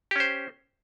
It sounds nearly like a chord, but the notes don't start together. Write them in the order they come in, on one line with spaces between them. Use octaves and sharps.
G4 C#4 C5